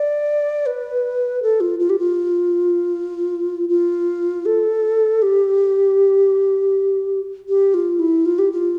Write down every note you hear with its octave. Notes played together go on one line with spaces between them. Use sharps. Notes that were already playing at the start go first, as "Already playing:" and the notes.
Already playing: D5
B4
A4
F4
F4
G4
F4
F4
A4
G4
G4
F4
E4
F4
G4
F4